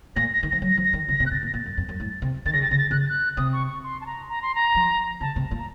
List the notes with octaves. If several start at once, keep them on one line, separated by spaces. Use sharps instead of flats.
A#2 A#6
A#6
D#3
F3 A#6
F#3
A#6
F3
A#6
D#3
C#3 A#6
C3
F#6
C3 A6
A#2 A#6
A#2 A6
F#2
F2
F#2
A2
C3
D#3 A6
C#3 A#6
C3 A6
C#3 A#6
A6
C#3 F#6
A6
F#6
C3 D#6
C#6
C#6
C6
A5
A#5
A#5
C6
A#5
F3
C#3 A5
C3
A#2
A#5